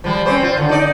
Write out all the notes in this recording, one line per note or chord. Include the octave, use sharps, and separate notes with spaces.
F3 G3
C4 C#4 C5
F4
D3
D#4 D5